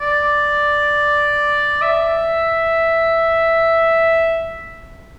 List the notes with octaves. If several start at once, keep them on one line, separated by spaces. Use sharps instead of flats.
D5
E5